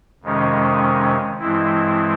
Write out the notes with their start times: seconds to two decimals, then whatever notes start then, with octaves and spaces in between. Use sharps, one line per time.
0.23 F2 C3 D#3 G#3 C#4
1.39 G2 E3 G#3 C4 E4